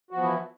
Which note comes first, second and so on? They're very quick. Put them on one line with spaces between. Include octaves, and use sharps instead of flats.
F#4 F3 B3 E3 E4